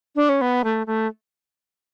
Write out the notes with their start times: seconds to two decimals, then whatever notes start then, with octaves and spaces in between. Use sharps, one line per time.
0.16 D4
0.29 C#4
0.41 B3
0.64 A3
0.87 A3